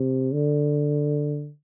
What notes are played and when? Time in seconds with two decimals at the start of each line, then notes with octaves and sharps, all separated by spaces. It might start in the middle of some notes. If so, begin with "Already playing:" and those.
Already playing: C3
0.32 D3